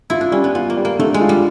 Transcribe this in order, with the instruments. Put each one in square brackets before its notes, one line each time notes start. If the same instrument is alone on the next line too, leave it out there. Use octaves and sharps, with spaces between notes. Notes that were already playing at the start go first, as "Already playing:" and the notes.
[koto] E4 [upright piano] F4
[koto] D4
[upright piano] G3 [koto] C#4
[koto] B3
[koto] B3 [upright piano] F4
[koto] A#3
[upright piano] G3
[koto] A#3
[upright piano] D3 [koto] A3
[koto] G#3
[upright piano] F4
[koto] G3